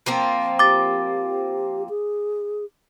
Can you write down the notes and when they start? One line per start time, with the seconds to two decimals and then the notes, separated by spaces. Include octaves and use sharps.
0.06 F3 A#3 C4
0.59 G4 D6 A6
1.89 G#4